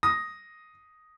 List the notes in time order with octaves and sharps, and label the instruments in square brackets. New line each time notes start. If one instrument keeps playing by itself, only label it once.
[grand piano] D#6 A#6